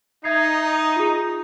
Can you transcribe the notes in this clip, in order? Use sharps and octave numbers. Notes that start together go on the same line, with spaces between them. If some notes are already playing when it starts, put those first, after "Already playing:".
D#4 E5 G#6 C7
F4 G#4